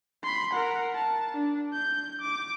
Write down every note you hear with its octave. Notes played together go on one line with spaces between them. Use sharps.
B5 C6
A#4 F#5
A5
D4
G6
D6